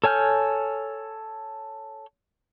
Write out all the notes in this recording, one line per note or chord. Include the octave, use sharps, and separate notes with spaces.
A4 C#5 G#5 F6 G6